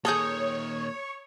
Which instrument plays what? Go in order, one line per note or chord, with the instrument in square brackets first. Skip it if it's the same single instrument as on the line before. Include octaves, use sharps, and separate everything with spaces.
[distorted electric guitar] A#2 D#3 [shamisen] G#4 A4 [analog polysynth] C#5 [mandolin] A#5 D#6 G6